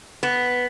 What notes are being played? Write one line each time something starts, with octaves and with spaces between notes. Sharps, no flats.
B3